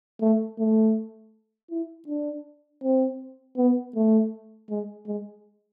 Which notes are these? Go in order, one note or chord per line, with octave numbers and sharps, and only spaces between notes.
A3
A3
E4
D4
C4
B3
A3
G#3
G#3